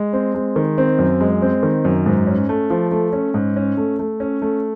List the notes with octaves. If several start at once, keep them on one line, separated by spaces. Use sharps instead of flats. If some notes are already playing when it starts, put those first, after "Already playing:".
Already playing: G#3
C4
G#3
D#3
C4
F#2
G#3
C4
D#3
F#2
G#2
C#4
A3
F3
A3
C#4
G#2
C#4
A3
A3
C#4
A3